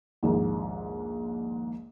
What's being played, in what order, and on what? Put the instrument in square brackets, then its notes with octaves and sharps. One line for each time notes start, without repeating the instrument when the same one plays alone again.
[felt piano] A#1 D#2 G#2